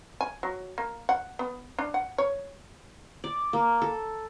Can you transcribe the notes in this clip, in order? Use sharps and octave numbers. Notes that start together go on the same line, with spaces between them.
G#5
F#3
A#3
F#5
B3
D4
F#5
C#5
D5
A#3
A4